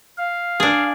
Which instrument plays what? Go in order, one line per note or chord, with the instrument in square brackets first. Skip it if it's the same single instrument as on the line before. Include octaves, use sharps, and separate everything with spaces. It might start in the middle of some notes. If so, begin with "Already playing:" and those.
[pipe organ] F5
[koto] D4 G#4